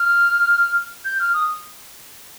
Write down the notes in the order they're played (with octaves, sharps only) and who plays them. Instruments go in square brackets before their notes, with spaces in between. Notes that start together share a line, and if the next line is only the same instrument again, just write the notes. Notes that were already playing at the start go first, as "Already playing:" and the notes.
Already playing: [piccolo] F6
G6
F6
D#6